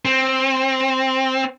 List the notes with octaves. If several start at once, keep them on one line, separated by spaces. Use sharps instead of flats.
C4